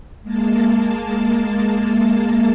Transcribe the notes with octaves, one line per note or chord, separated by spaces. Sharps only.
G#3 A#3 A5